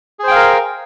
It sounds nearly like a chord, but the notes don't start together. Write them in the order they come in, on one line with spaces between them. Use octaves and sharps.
G#4 C5 G5 F5 A#4